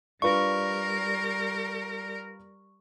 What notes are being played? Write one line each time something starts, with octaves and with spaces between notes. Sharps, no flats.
G3 D4 F4 A#4 B4 C#6